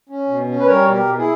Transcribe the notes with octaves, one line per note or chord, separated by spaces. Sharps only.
C#4
B2
C#4
B4
G3 A#4 C#5
B2
G4 A#4
B2
E4 G#4